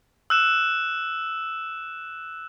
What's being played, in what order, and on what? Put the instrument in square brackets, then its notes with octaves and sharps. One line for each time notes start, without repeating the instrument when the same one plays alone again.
[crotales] E6 F#6 E7